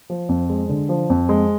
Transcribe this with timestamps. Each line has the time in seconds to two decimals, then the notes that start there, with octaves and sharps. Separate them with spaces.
0.10 F3
0.29 F2
0.50 G#3
0.69 D3
0.89 F3
1.10 F2
1.29 G#3